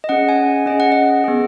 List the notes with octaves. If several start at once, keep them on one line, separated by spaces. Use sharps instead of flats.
D#5
C#4 G#4 F#5
G#5
C#4 G#4 D#5
F#5
D#5
B3 G#4